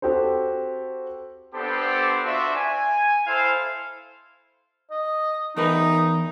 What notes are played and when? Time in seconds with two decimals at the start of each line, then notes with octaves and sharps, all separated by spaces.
0.02 C4 F#4 G4 A4 C5
1.54 B3 C4 D4 G4 A4 C5
2.25 D4 F4 F#4 C5 E5
2.56 G#5
3.27 E4 A4 C5 F5
4.91 D#5
5.56 E2 D#4 A#4 B4